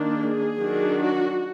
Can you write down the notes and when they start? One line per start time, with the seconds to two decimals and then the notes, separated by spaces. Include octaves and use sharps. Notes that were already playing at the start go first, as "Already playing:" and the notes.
Already playing: D#3 A#3 D4
0.15 G#4
0.58 D#3 F#3 D4
1.01 F#4